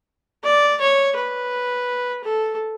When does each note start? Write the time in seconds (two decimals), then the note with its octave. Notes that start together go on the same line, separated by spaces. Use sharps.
0.44 D5
0.80 C#5
1.16 B4
2.24 A4